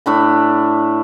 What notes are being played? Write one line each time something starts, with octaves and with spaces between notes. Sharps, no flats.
A2 D4 B5